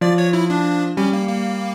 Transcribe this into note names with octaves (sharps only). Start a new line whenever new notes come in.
F3 D5
C#5
E4
D4
G3 C#4
A#3
A#3